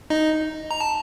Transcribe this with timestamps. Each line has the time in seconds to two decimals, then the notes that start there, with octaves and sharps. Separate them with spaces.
0.10 D#4 D#5
0.71 A#5
0.81 A5